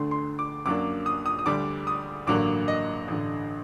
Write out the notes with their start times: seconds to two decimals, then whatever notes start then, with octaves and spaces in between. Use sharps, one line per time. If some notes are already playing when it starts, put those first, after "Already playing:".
Already playing: D2 D3 A3 D4 C6
0.11 C6
0.39 D6
0.66 F#2 F#3 A#3 D4 D6
1.06 D#6
1.26 D#6
1.39 D#6
1.46 D2 D3 G3 D4 D6
1.87 D#6
2.27 A1 G2 D3 F#3 A#3 D6
2.68 D#5
3.08 A1 G2 D3